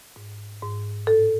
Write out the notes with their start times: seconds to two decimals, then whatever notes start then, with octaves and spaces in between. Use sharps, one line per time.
0.16 G#2
0.62 G#2
1.07 A2 A4